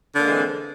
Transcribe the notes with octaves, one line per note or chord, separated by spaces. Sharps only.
D3 E3 G#3 A#3 C4